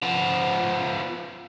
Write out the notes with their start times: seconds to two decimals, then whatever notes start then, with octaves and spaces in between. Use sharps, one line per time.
0.02 F3 B3